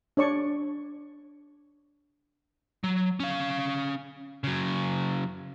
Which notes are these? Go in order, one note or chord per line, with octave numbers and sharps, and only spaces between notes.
D4 C#5 D5 C#6
F#3
C#4 F5
C#3 F#3